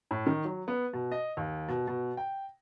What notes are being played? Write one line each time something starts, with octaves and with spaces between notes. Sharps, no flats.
A2
D#3
F#3
B3
B2
D#5
D#2
B2
B2
G5